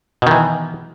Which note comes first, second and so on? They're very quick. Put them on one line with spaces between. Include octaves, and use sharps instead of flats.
B2 D#3 E3